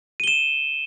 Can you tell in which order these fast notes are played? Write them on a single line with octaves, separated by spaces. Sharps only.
D#7 G7 E7